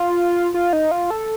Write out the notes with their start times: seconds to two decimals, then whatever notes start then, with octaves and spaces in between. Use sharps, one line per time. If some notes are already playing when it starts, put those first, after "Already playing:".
Already playing: F4
0.54 F4
0.73 D#4
0.91 F4
1.10 A4